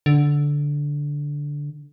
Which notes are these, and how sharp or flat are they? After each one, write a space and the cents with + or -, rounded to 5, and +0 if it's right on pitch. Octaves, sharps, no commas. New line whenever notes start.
D3 -10